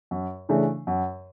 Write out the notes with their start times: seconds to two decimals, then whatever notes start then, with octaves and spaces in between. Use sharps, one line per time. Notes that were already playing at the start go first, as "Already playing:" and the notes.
0.11 F#2
0.49 C#3 E3 A3 D4
0.87 F#2